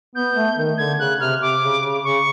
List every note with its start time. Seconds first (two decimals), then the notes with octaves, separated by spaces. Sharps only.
0.15 B3 G6
0.36 A3
0.57 D#3
0.78 D3 G#6
0.99 C#3 F#6
1.20 C3 F6
1.41 C3 D6
1.63 C#3
1.83 C#3
2.04 C#3 C#6